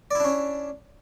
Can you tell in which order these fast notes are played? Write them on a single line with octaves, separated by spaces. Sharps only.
D5 E4 D4 C#4